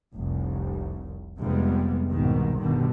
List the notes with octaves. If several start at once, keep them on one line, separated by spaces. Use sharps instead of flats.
F1 C2
F1 C3 G3 G#3 B3
C2 G#2 B2 D#3 B3
G1 B2 D3 D#3 G3